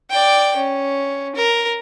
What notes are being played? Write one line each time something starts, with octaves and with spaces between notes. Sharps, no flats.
D5 G5
C#4
A#4